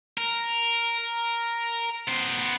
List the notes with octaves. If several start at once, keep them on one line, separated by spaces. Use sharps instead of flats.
A#4
B3 C5